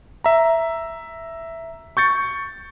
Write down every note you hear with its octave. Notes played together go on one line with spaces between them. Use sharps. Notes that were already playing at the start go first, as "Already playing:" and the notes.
E5 A#5
C#6 G6 A6 C#7